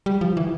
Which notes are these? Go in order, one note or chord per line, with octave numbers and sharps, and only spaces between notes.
G3
F3
E3